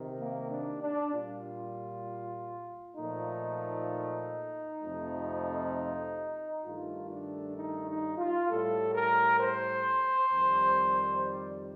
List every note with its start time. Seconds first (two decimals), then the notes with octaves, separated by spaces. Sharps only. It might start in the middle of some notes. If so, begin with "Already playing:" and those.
Already playing: C3 D#3
0.21 A#3
0.51 D4
0.82 D4
1.13 A#2 G3 F4
2.96 A#2 F3 A3 D#4
4.80 F2 C3 F3 A3
6.65 G2 D#3 A3 F4
7.10 D4
7.56 D#4
7.87 D#4
8.18 F4
8.48 A2 G3 A4
8.95 A#4
9.41 C5
10.32 F2 D#3 G3
11.24 D5